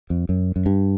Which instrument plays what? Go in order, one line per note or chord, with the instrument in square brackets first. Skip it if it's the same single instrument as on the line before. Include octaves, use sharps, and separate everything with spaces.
[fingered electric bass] F2
F#2
F#2
G2